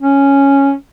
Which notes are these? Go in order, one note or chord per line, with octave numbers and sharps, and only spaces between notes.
C#4